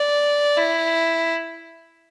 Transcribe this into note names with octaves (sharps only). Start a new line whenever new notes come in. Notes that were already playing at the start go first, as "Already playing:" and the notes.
Already playing: D5
E4